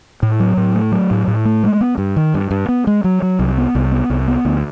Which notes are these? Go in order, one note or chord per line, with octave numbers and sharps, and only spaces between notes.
A2
F#3
A2
A3
F#3
A2
A2
A3
G#3
B3
G2
D#3
G2
G2
B3
G#3
F#3
F#3
C2
B3
C2
B3
C2
B3
D2